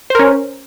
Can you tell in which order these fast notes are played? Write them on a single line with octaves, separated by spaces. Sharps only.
C5 A#4 C#4